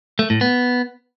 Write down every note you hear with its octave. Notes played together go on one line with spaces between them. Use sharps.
A3
A2
B3